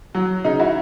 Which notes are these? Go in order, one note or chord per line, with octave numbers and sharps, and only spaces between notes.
F#3
C#3 D#4
E4 F#4